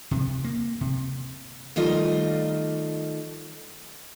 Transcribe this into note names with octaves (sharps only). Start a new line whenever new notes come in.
C3
A#3
C3
D#3 G3 A3 F4 D#5